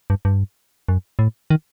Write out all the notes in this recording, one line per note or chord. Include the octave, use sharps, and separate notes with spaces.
G2
G2
F#2
A2
D#3